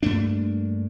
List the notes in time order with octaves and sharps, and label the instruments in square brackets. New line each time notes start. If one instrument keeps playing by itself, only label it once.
[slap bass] G2 A3 A#3 D4